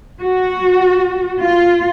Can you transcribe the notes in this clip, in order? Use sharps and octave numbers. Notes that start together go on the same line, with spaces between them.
F#4
F4